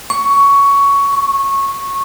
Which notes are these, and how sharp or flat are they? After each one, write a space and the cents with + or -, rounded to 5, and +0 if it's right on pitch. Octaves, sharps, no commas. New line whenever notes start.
C#6 +15
C#6 -15